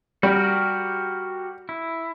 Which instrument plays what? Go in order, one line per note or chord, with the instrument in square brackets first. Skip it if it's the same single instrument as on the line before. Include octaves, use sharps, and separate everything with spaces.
[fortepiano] G3 [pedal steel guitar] F#4 G4 A#4
[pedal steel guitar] E4